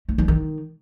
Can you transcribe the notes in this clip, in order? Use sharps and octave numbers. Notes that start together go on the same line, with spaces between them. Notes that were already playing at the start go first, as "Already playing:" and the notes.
A3
F3
D#3